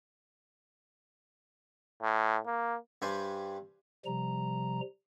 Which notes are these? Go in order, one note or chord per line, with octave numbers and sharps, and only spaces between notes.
A2
A#3
G2 G3 D4 C5 G#5
C3 F3 G3 A#5